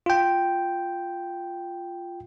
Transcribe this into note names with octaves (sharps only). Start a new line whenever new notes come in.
F4 G5